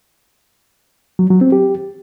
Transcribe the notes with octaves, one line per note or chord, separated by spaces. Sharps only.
F#3
F#3
C4
G4